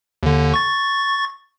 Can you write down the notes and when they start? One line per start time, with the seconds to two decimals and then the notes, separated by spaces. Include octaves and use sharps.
0.23 D#2 D3
0.54 C#6 A6